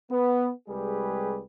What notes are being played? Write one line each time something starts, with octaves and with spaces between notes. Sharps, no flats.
B3
C2 G3 G#3 G4 G#4 B4